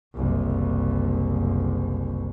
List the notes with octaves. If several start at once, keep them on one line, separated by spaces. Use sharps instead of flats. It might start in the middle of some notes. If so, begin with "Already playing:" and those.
F#1 C2